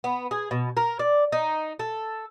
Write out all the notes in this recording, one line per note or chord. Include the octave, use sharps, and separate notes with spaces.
B3
G#4
B2
A#4
D5
D#4
A4